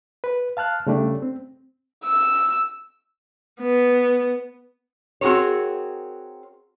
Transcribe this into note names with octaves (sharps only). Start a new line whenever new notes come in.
B4
F5 A5 F6 F#6
C#3 G3 A3 D4
C4
E6
B3
C4 F#4 G#4 A#4 C#5